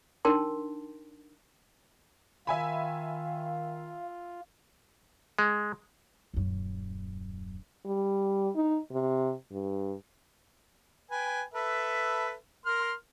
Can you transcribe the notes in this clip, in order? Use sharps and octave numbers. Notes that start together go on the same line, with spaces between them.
D4 D#4 A#4 G5 A5 C6
D#3 F4 E5 F5 G#5 B5
G#3
D#1 F#2
G3
D#4
C3
G2
B4 G5 G#5
A4 B4 E5
A#4 C6 F6